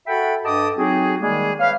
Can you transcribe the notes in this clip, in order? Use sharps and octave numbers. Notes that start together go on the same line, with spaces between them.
F#4 A4 E5 F#5 G5 B5
G2 A4 D#5 A5 D6 D#6
F#3 C4 D#4 F#4 G#4
D#3 G3 G#3 A#3 G#4
B4 C#5 E5 F5